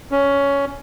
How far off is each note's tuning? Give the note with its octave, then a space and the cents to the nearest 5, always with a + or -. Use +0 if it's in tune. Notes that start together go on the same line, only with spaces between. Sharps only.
C#4 +10